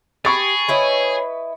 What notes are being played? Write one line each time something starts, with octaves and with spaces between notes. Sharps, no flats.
G4 G#4 B5 C#6 A6
E4 B4 C#5 D#5